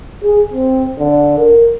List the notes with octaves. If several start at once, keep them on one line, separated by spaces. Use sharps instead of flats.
G#4
C4
D3
A#4